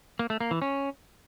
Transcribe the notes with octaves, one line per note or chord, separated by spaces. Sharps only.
A#3
A3
A#3
E3
C#4